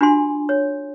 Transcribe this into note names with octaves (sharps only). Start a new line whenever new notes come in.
D4 F4 F#4 G#5 C6
C#5